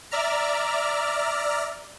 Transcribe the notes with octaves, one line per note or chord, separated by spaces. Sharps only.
D5 E5 A#5 F6